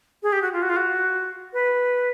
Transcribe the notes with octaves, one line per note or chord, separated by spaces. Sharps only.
G#4
G4
F#4
F4
F#4
F4
F#4
B4